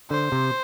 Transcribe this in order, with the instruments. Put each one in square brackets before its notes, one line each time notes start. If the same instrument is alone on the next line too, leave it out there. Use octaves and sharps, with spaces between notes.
[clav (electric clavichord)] D3 [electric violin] C5
[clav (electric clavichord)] C3